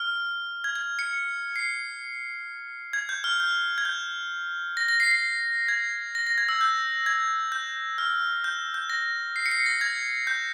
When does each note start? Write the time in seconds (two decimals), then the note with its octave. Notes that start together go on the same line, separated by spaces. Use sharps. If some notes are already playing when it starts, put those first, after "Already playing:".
Already playing: F6
0.64 G#6
0.76 G#6
0.99 C#7
1.56 C7
2.93 G#6
3.09 G6
3.24 F6
3.40 G6
3.78 G#6
3.85 G6
4.77 A#6
4.89 A#6
5.00 C7
5.11 C7
5.68 G#6
6.15 A#6
6.27 A#6
6.38 G#6
6.49 E6
6.61 G6
7.06 G#6
7.52 G6
7.98 F6
8.44 G6
8.74 G6
8.90 A#6
9.36 C7
9.46 C#7
9.51 C7
9.66 A#6
9.81 G#6
10.27 G6